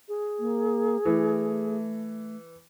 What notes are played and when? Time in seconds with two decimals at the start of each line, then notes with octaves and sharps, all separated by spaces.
0.08 G#4
0.39 A#3
1.05 E3 A3